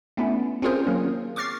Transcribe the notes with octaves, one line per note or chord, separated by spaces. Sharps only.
A3 B3 C#4 D4 E4
C4 C#4 F4 G#4 A#4 C5
D#3 F#3 A#3 C#4
C#6 D6 F6 A6 C7